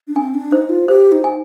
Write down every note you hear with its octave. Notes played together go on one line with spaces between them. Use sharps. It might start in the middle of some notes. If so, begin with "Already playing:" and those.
D4
C4 G#5
D4
D#4 C5
F4
G4 C5
D#4
G#5